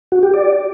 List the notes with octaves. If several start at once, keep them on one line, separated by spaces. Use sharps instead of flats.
F#4
G4
D5